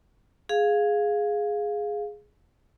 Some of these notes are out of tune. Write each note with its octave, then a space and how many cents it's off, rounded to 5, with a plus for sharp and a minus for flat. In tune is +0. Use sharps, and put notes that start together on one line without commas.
G#4 +0 F5 +5